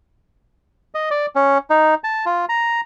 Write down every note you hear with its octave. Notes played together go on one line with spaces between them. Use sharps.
D#5
D5
C#4
D#4
A5
F4
A#5